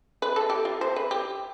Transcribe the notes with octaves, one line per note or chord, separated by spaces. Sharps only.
B4
A4
G4
F4
C5
B4
G4